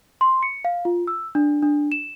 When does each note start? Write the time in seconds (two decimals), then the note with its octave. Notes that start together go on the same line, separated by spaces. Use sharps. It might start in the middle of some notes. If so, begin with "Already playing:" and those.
0.21 C6
0.43 C#7
0.65 F5
0.85 F4
1.07 E6
1.35 D4
1.63 D4
1.92 E7